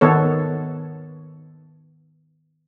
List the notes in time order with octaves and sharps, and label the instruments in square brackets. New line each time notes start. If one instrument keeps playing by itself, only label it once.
[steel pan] D#3 B3 A4 C#5